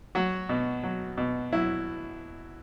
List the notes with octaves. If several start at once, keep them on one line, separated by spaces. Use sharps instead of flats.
F#3 F#4
B2
F#3
B2
F#3 E4